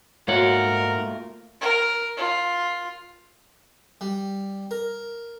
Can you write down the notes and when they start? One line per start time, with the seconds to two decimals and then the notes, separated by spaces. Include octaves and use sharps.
0.28 G#2 A3 A#3 F4 F#4 A#4 C#5 F#5
1.61 A#4
2.17 F4
4.01 G3
4.71 A#4